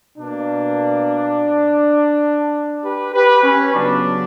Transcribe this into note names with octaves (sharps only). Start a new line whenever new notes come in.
B2 A#3 D4
G4 B4
G4 B4
C#4
C#3 F#3 B3 D4